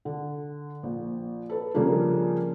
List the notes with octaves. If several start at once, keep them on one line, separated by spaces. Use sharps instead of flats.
D3
A#1
A4 B4
C#3 F3 G3 A#3 D4